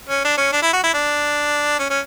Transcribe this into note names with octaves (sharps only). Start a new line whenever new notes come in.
C#4
D4
C#4
D4
E4
F#4
E4
D4
C#4
C#4